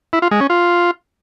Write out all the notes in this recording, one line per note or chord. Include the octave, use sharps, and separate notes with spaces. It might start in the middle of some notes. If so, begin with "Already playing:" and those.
E4
F4
G#3
C#4
F4